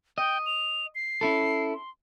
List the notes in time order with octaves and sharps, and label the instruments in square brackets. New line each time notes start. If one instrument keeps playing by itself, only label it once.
[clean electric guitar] D#5 [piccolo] G5
[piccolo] F7
C7
[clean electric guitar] C#4 E4 A4
[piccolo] C6